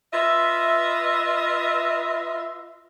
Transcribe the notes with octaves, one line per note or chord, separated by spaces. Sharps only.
F4 B4 D#5 E5